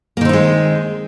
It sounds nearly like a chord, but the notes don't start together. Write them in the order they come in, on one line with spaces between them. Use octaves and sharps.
A#3 D#3 C4 D#4 G#3